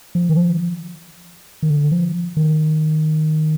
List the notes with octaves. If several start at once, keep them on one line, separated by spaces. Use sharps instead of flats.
F3
D#3
F3
D#3
D3
F3
D#3